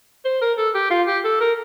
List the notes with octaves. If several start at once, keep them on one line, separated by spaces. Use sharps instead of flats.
C5
A#4
A4
G4
F4
G4
A4
A#4